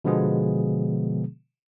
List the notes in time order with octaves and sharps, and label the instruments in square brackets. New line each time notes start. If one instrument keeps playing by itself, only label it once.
[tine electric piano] B2 D3 F3 G#3 B3 G#4